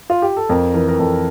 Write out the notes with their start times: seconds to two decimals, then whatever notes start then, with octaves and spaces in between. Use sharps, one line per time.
0.10 F4
0.22 G4
0.37 A4
0.49 F2 A#4
0.74 E3 A#4
0.88 A#4
0.99 F2 A4